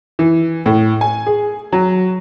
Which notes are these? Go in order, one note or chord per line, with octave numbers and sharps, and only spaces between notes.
E3
A2
G#5
G#4
F#3